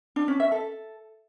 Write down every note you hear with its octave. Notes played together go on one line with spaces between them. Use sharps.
D4
C#4
E5
A4